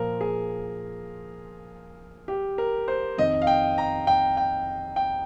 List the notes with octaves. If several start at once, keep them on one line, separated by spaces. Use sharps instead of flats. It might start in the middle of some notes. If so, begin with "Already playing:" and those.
Already playing: A#2 F3 A#4
G#4
G4
A#4
C5
F2 D#3 D#5
F5
G5
A#5
G5
G5
G5